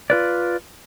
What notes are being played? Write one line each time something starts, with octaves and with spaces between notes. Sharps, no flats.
F4 B4 D5